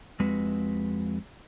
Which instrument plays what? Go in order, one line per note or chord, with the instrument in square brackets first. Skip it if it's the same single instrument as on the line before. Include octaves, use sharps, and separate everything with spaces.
[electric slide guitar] F2 G#3 C4 F#4 B4